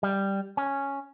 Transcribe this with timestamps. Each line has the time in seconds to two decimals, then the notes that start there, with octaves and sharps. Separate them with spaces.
0.03 G3
0.57 C#4